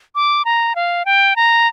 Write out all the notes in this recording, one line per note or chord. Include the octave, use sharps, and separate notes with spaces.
D6
A#5
F5
G5
A#5